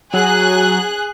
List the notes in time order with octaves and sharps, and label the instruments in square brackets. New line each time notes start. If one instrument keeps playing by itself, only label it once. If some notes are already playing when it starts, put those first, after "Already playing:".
[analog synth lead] F#3 [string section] G#4 F#6